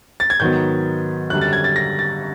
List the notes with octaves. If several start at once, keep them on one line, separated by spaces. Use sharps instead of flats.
A6
G#6
G#2 D#3 F#3 B3 G6
F#2 D3 G3 F#6
A6
G#6
A6
A#6
A6